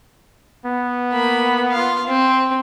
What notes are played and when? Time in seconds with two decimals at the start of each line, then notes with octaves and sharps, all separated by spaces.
0.65 B3
1.13 A#3 B5
1.72 F4 F5
2.07 C4